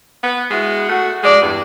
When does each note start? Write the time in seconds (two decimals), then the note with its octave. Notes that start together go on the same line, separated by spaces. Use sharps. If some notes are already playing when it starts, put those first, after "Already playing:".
0.24 B3 B4
0.51 G#3 E4 F#4
0.89 A3 F#4
1.24 G#3 D5
1.42 E2 G2